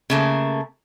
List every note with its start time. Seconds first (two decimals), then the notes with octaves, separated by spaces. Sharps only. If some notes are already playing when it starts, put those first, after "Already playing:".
0.10 C#3 A3 A#3